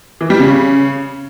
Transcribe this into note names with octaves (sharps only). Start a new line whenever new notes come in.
E3
G3
C#3